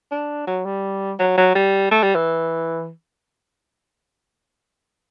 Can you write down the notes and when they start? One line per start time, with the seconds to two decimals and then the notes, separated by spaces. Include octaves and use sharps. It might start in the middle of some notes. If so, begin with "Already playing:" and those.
0.12 D4
0.47 F#3
0.65 G3
1.19 F#3
1.37 F#3
1.55 G3
1.91 A3
2.03 G3
2.15 E3